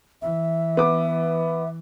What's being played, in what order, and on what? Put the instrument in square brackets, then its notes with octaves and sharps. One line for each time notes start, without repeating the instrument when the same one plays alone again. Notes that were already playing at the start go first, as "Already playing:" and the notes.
[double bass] E3 [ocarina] E5
[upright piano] B3 D6